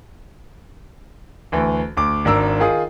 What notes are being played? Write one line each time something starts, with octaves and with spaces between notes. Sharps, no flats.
D2 E3
D2 D6
G#1 D4 A#4 E6
D#3 F4 G#4 D#6